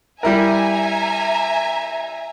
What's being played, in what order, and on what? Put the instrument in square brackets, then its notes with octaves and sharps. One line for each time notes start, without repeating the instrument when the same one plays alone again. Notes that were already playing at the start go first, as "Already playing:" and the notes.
[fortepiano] G3 E4 A#4 [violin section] E5 G#5 A#5